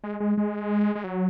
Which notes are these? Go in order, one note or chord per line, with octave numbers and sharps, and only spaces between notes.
G#3
G#3
G#3
G#3
F#3